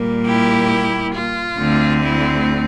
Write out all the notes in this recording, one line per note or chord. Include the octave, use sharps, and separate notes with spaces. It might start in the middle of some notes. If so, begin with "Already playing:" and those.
Already playing: A#2 G3 A#3
E4 G4
F4
D2 D3 A3 C4
E4